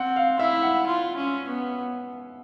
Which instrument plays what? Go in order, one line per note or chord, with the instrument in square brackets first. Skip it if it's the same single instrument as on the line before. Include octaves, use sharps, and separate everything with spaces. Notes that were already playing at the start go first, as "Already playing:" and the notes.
Already playing: [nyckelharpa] C4 [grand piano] F#5
[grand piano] F5
[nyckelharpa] E4 [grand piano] E5
[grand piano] F#5
[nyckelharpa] F4
C#4
B3